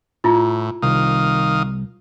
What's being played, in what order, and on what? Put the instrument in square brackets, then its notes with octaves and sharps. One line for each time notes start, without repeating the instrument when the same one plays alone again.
[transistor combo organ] A2 [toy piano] E4 F4
[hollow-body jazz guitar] C2 [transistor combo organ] D#3 F5 D#6